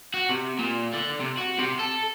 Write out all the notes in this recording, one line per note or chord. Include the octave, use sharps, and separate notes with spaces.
F#4
C3
A#2
D3
C3
F#4
C3
A4